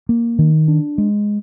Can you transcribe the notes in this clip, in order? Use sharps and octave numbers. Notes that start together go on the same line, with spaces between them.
A#3
D#3
D4
G#3